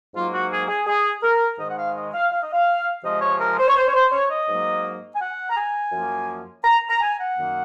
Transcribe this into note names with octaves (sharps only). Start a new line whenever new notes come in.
G#2 F#3 A#3 F4
F#4
G#4
G#4
G#4
A#4
G#2 D#3 G#3 D#5
F#5
F5
D#5
F5
F5
D#5
F5
C3 F3 G#3 D#5
C#5
A#4
C5
C#5
C5
C#5
C5
C#5
D#5
G#2 F#3 A#3
G#5
F#5
A#5
G#5
F#2 F3 A#3
A#5
A#5
G#5
F#5
F#2 D#3 A#3